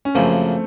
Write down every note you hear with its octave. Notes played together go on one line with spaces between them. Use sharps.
C#4
F#2 C#3 F3 A3 A#3 C4